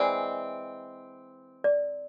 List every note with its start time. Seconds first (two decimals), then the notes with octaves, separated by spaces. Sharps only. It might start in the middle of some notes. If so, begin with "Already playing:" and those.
Already playing: E3 G#3 C4 D5
1.64 D5